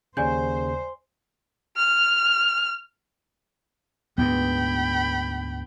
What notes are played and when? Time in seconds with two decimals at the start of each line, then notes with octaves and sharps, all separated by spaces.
0.17 D#2 C#3 C5 D5 G#5 G6
1.77 F6
4.18 D2 G#2 B3 G5 B5